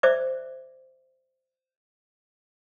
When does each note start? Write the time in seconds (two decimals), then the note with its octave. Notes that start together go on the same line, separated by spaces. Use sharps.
0.03 C5 D5 E5 D6